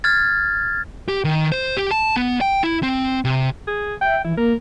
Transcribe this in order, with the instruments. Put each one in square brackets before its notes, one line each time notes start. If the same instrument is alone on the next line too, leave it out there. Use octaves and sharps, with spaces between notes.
[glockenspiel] F6 G#6 A6
[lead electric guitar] G4
D#3
C5
G4
A5
B3
G5
E4
C4
C3
[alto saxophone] G#4
[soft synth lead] E5 [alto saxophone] G5
[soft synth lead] E3 [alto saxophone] E4
[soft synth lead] A#3 [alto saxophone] A#4